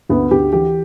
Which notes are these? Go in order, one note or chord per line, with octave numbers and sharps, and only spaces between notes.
D2 B3
D2 G4
E3 G4